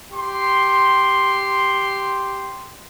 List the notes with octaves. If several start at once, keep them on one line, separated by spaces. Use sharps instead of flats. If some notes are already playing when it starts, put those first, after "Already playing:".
G4 C6